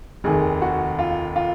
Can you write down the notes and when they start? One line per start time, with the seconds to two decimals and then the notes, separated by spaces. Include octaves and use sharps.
0.24 F1 D#2 D#3 G#4
0.62 F#4
0.99 F4
1.36 F4